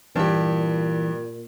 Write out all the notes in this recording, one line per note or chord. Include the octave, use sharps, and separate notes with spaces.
G2 A#2 E3 G4